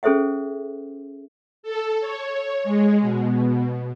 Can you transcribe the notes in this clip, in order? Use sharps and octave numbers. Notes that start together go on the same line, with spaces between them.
C#4 G#4 A4 C5 E5 F#5
A4
C#5
G#3
B2